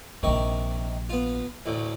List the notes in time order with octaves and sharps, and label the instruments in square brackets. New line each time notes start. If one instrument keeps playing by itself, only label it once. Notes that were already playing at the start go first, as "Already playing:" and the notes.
[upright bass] A#1 F3 [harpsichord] C3 D#3 C#6
[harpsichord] B3 F4
A1 D2 A2